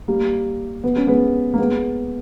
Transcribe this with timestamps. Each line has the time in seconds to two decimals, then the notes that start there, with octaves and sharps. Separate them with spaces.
0.08 G3 A#3
0.84 B3
0.96 C#4
1.07 G#3 B3
1.54 A#3
1.59 G#3 B3